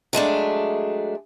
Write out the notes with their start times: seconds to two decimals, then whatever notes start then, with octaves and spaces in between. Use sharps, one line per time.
0.13 F#3 G#3 A3 D4